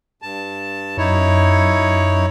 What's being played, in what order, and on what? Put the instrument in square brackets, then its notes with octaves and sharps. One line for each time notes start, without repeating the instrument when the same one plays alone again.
[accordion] G2 A5
[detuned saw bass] F#2 [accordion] D#4 E4 C#5